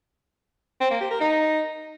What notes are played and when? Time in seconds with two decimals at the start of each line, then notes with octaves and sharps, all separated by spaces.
0.81 C4
0.91 A#3
1.01 G4
1.11 A#4
1.21 D#4